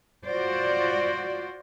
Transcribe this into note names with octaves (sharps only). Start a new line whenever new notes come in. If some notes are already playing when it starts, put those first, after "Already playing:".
F4 F#4 C5 D5